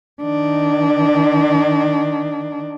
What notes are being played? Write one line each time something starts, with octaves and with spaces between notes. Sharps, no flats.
D#3 D4